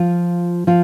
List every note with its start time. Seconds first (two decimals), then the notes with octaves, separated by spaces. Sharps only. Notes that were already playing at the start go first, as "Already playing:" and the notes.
Already playing: F3 F4
0.67 F3 F4